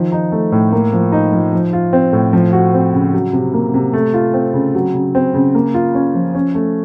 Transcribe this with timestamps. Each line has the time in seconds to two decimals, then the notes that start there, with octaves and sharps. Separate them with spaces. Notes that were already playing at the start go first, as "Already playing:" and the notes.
Already playing: D#3 F3
0.12 D#4
0.32 A3
0.52 A2
0.72 A#3
0.93 F3
1.12 D#4
1.33 F3
1.53 F3
1.73 F4
1.93 C4
2.13 A2
2.33 F3
2.53 F#4
2.74 C4
2.93 C#3
3.13 F#3
3.33 C3
3.54 A#3
3.74 C3
3.93 A3
4.14 F4
4.34 C4
4.54 C#3
4.75 F#3
4.94 C#3
5.15 C4
5.34 C#3
5.55 A#3
5.74 F4
5.95 C#4
6.15 F3
6.35 C#4
6.55 A3